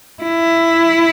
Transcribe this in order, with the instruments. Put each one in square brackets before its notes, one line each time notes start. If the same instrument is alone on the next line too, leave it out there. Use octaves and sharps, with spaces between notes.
[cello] E4